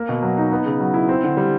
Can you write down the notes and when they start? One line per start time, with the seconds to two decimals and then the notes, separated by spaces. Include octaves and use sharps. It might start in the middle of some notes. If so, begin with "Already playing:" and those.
Already playing: A#3
0.09 B2
0.23 F#3
0.38 D#4
0.52 B3
0.65 C#3
0.80 F#3
0.94 E4
1.09 C4
1.24 D3
1.37 G3